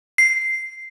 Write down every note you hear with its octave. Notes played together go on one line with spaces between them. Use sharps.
C7